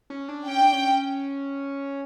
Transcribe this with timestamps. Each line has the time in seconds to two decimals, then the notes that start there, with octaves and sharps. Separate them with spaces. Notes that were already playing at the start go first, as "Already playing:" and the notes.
0.10 C#4
0.29 D4
0.47 C#4 G5
0.61 D4
0.73 C#4